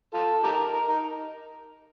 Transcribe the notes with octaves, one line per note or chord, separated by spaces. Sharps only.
F4 A4
D#4 G4 A#4
A#4
D#4